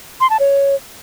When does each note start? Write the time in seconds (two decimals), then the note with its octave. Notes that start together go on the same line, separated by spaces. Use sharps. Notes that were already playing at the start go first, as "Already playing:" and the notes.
0.20 C6
0.30 A5
0.40 C#5